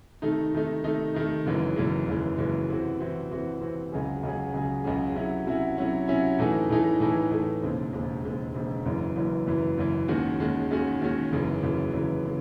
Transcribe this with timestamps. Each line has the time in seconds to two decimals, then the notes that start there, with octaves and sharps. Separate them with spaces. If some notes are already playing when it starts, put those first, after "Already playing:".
0.22 C3 D#3 A3 D#4
0.53 C3 D#3 A3 D#4
0.84 C3 D#3 A3 D#4
1.14 C3 D#3 A3 D#4
1.46 F#1 F#2 E3 G#3
1.76 F#1 F#2 E3 G#3
2.07 F#1 F#2 E3 G#3
2.38 F#1 F#2 E3 G#3
2.69 C3 E3 C4 F#4
2.99 C3 E3 C4 F#4
3.30 C3 E3 C4 F#4
3.61 C3 E3 C4 F#4
3.92 C#2 C#3 F#3 C#4 G#4
4.23 C#2 C#3 F#3 C#4 G#4
4.54 C#2 C#3 F#3 C#4 G#4
4.84 C#2 C#3 F#3 C#4 G#4
5.15 C3 F#3 C#4 E4
5.46 C3 F#3 C#4 E4
5.77 C3 F#3 C#4 E4
6.08 C3 F#3 C#4 E4
6.39 A2 E3 A3 D#4 G#4
6.69 A2 E3 A3 D#4 G#4
7.00 A2 E3 A3 D#4 G#4
7.31 A2 E3 A3 D#4 G#4
7.62 E1 D#2 C#3 G#3 C4
7.93 E1 D#2 C#3 G#3 C4
8.23 E1 D#2 C#3 G#3 C4
8.54 E1 D#2 C#3 G#3 C4
8.85 F#1 F#2 E3
9.16 F#1 F#2 E3
9.47 F#1 F#2 E3
9.77 F#1 F#2 E3
10.08 D#2 D#3 G#3 C#4 F#4
10.40 D#2 D#3 G#3 C#4 F#4
10.70 D#2 D#3 G#3 C#4 F#4
11.01 D#2 D#3 G#3 C#4 F#4
11.32 F#1 F#2 C#3 E3
11.62 F#1 F#2 C#3 E3
11.93 F#1 F#2 C#3 E3
12.26 C#3